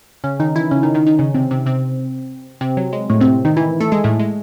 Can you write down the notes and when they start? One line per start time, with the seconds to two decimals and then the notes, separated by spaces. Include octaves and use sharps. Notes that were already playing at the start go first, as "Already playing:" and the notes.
0.24 C#3 C#4
0.40 D#3 D#4
0.56 E3 E4
0.71 C#3 C#4
0.83 D#3 D#4
0.95 D#3 D#4
1.06 D#3 D#4
1.19 C#3 C#4
1.34 C3 C4
1.51 C3 C4
1.66 C3 C4
2.61 C3 C4
2.77 F#3
2.93 G#3
3.10 A2 A3
3.21 C3 C4
3.45 D#3 D#4
3.57 E3 E4
3.80 A3 A4
3.92 G#3 G#4
4.04 A2 A3
4.19 G#3